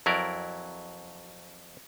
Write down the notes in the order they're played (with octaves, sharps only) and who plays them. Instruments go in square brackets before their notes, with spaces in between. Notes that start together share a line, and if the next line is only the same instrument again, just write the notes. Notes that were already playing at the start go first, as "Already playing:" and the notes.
[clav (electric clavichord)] F2 F#3 E4 A#4 D5